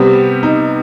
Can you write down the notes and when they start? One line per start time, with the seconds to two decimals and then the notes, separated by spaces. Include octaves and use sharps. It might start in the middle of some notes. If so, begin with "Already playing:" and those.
Already playing: C3 G3 B3 C4
0.43 D#4